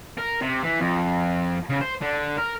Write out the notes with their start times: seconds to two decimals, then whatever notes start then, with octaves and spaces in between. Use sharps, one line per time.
0.18 A#4
0.41 C3
0.63 E3
0.80 F2
1.69 C#3
1.81 C5
2.01 D3
2.37 A#4